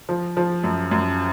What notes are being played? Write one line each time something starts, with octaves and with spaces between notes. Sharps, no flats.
F3
F3
F#2
F#2